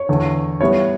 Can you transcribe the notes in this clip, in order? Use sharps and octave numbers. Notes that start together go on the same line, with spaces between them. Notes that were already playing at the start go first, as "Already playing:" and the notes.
Already playing: C#5
E2 D3 A3
A2 G3 B3 C#5